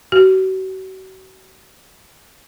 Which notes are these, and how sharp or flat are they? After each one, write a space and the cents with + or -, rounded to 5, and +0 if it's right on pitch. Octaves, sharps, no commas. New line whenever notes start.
F#4 +40